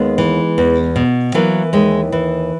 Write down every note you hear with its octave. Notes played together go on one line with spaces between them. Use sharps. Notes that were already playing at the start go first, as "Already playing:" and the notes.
Already playing: D#2 G#3 B3
E3
E2
B2
E3 F#3 A#3
D#2 G#3
E3